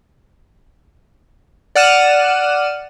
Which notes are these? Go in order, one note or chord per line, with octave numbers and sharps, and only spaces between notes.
D5 F#5 F6 D#7 E7